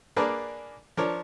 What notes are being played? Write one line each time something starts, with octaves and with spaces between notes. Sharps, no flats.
A#3 D4 G#4 A#4 B4 D5
F3 D4 A#4 C#5